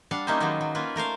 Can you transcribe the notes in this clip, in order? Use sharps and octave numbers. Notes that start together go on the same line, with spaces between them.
G3 D4 F5 F#5
A#3 C#4 D#4 E4 G4 C5
D#3 F#3 G#3 A#3 B3
F#3
A#3 C#4 F4 A#4 B4
A3 A#4 C5 F5